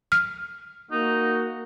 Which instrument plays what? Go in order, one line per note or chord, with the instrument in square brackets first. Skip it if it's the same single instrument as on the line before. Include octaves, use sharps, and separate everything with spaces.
[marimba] F6
[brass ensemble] A#3 F#4 [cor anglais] D#4